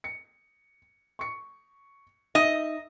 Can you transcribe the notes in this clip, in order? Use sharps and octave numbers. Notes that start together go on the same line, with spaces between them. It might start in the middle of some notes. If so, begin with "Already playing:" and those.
C#7
C#6 C#7
D#4 D#5 E5